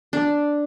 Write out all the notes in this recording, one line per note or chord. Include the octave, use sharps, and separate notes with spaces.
D4